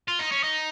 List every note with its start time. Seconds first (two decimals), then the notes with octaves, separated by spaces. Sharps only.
0.08 F4
0.19 D#4
0.32 C#4
0.44 D#4